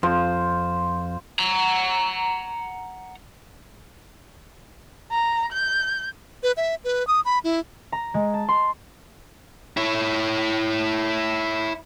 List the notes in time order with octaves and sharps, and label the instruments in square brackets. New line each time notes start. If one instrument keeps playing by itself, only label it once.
[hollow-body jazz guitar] F2 [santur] F4 C5
[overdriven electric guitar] F#5 A#5
[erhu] A#5
G6
[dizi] B4
E5
B4
D#6
B5
E4
[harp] A#5
G#3
A5
C6
[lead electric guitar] E4 C#5